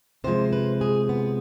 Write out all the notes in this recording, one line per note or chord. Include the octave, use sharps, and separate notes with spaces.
C3 F3 G#3 C5
B4
G#4
B3